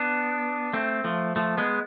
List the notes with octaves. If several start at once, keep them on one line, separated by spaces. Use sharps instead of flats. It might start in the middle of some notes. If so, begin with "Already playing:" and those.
Already playing: B3 D4
A3 C4
F3 A3
F3 A3
G#3 B3